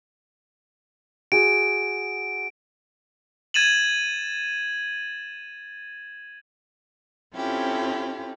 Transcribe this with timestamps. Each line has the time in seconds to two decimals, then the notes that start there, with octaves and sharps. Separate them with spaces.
1.32 F#4 G#4 D7
3.54 G#6 A6 D#7 E7 F#7
7.34 C4 C#4 E4 F4 G4 A4